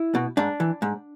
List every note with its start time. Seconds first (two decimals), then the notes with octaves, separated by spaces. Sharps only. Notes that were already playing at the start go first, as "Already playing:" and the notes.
Already playing: E4
0.15 B2
0.37 G#2 D4
0.60 E3
0.82 G#2